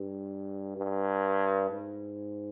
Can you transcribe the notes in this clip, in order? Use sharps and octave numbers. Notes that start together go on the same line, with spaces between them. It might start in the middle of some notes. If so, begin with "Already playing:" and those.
Already playing: G2
G2
G#2